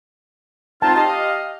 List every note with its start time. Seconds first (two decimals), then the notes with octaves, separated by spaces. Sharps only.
0.82 C4 D#4 F4 A5
0.96 G4 D#5 F5